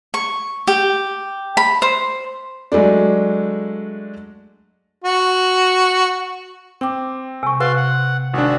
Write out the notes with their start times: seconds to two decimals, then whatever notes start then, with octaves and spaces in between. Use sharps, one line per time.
0.14 C#6
0.67 G4
1.57 B5
1.82 C5
2.72 F#3 G#3 A3 D4
5.04 F#4
6.81 C4 G5 D6
7.43 C3 G#5 C#6
7.60 C3 F#4 B4 F5 C6 F#6 A6
7.77 F#5
8.34 G#1 D4 F#4